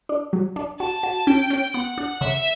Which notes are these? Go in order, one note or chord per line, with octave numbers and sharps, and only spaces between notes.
D4
F#3
D4
F#4 A5
F#4
C#4 G5
C#4
B3 F#5
D4
C#3 E5